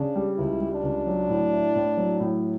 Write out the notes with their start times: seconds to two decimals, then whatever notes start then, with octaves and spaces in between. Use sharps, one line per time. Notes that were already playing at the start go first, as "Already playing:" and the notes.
Already playing: C#3 D4
0.15 G3
0.38 C#2 E4
0.60 G3
0.72 D4
0.83 C#2
1.06 F#3
1.29 A2
1.53 E4
1.76 A2
1.97 F#3
2.20 A2